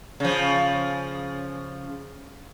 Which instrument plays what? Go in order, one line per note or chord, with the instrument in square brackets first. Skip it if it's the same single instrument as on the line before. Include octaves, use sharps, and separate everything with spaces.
[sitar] C#3 F3